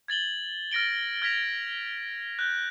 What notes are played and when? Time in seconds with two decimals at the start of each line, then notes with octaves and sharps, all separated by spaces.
0.08 G#6 A6 F#7 G7
0.71 F6 A6 A#6 D7 G7
1.22 F6 G#6 A#6 B6 F7
2.39 F#6 G6